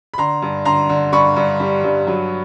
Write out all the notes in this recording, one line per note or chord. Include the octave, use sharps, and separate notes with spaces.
B5
D3 A#5 C6
G2
D3 A#5 C6
D3
G2 B5 C#6
G2
G3
G2
F#3